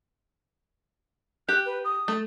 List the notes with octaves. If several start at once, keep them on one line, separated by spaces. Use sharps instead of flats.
G4 F#6
B4
D#6
A3